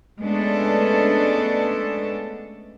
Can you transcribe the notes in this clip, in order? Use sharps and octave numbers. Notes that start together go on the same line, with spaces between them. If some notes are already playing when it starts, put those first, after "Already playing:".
G#3 A3 B3 C#4 D4 A4